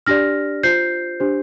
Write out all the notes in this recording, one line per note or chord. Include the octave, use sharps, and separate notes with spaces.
D4 G4 D5 F6 A#6
F4 C5 G6 C7
D4 G4 C5